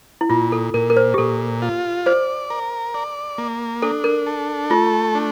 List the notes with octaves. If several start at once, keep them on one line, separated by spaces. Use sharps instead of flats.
E4
A#2 F4
A4
A#2 A#4
A#4
C5
G4
A#2 A4
F4
C5 D5
A#4
D5
A#3
D4 A4
A#4
A4
A3 F4
D4